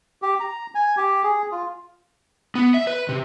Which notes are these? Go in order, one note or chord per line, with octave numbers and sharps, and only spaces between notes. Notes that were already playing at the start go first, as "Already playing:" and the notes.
G4
A#5
G#5
G4
G#4
F4
B3
E5
B4
C3